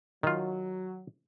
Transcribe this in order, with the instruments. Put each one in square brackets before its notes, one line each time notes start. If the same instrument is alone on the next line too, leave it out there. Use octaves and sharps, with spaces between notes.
[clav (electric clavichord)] D#3 F4 [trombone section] F#3